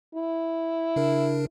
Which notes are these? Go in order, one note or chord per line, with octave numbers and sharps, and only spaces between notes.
E4
C#3 D4 A#4